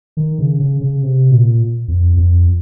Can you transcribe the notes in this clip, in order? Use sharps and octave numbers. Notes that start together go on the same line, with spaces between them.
D#3
C#3
C#3
C#3
C3
A#2
F2
F2